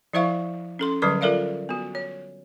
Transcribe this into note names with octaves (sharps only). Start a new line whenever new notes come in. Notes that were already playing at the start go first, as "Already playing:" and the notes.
F3 E4 C5 E5 F5 C#6
C#4 A4 C6
D3 F#3 G3 B4 B5 D6
F4 A4 A#4 D5 E5 F5
B3 F#4
C#5